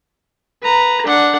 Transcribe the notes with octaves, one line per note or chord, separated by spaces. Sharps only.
B4 A#5
D4 F#5